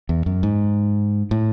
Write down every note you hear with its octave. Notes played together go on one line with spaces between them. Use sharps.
E2
F#2
G#2
A2